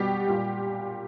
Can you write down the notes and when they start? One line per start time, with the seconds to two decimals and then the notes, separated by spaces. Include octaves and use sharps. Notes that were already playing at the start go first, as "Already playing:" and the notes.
Already playing: B2 G3 G4
0.28 A#2 G3